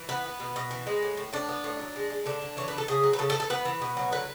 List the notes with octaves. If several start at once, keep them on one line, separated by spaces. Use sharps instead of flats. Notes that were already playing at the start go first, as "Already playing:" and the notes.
Already playing: E3
B3 B4
B3
B2
B2
E3
G#3
A2
A2
A2 D4
B3
A2
F#3
G#3
G#3
D3 D4
D3
E3 C#5
B4
E3
A4
C#3 G#4
F#3
B4
C#3 A4
A4
E3
A4
B3 B4
E3
B2
F#3
D3 B4